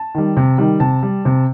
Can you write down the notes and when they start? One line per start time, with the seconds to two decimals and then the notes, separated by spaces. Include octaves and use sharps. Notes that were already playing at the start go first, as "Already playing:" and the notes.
Already playing: A5
0.15 D#3 G3
0.37 C3
0.58 D#3 G3
0.80 C3 A5
1.03 G3
1.25 C3